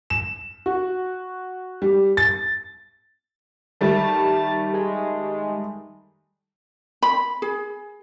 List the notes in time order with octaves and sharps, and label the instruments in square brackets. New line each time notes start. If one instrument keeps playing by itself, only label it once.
[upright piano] E7
F#4
G3
A6
[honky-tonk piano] D#3 G3 A3 [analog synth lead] A5
[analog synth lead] G#3
[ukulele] B5
G#4